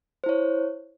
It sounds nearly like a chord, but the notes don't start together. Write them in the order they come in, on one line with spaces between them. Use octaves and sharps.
C5 E4 C#5